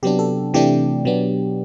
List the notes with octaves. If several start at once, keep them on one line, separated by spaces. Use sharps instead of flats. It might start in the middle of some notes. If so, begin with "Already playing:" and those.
C3 F#3 B3 D4 G4
A4
C3 E3 A3 D4 G4
B2 F#3 B3 D4